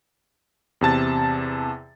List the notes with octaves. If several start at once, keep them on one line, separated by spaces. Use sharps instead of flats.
E2 C3 A5 A6